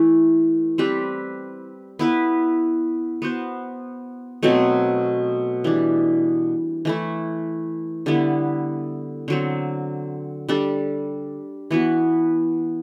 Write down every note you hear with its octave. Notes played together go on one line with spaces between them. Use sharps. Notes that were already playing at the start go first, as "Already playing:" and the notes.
Already playing: E3 A3 E4
G3 C4 G4 B4
B3 E4 B4
B3 F#4 C5
B2 F#3 A3 C4
E3 G3 D4
E3 A3 E4
D3 G3 B3 E4
D3 F#3 C4
G3 D4 A4
E3 B3 F#4